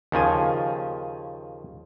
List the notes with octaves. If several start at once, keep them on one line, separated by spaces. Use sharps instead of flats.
D#2 C#3 F3 G#5